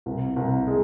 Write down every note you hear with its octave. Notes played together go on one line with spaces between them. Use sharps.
C2
C2
G#3